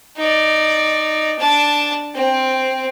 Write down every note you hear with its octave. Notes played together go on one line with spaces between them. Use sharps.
D#4 D5
D4 A5
C4